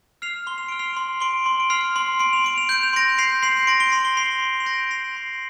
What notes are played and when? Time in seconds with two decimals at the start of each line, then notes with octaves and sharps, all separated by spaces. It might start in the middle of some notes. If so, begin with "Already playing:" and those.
0.22 F6 C7 F7
0.47 C6 G7
0.58 F7
0.69 F6 D7
0.79 C7 F7
0.97 C6
1.20 C6 D7 G7
1.46 C6
1.60 D7
1.70 F6 C7 F7
1.96 C6
2.20 C6 D7
2.33 F7
2.44 C6 D7
2.58 F7
2.69 G6 D7
2.83 F7
2.93 C6 A#6 D7
3.18 G6 C7 F7
3.43 C6 C7 F7
3.57 C7
3.67 C6 A#6 D7
3.80 D7 G7
3.92 C6 C7 F7
4.05 D7 G7
4.17 C6 C7 F7
4.42 C6
4.60 F7
4.66 G6 A#6 D7
4.91 C6 C7 F7
5.16 C6